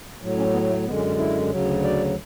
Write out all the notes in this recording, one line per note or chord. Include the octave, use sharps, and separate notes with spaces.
A2 F#3
C#4
B3
A3
F#2 D3 G#3 B3
C#4
C#4
E4
D2 C#3 F#3
D5